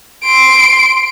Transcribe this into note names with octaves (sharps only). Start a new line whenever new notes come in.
C6 D7